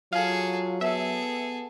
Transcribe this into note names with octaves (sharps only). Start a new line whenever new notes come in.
F#3 F4 G#4 A4 F5
B3 G#4 A4 E5